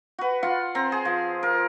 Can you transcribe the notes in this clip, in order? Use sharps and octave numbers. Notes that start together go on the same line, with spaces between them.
F#4 B4
F4 F#5 C6
C4 A#5 C6
G#4
F3
A#4